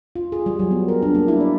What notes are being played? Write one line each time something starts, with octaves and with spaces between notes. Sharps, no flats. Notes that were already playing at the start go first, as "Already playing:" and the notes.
F4
G#4
G3
F#3
B3
A#4
D4
A#3
E4
D5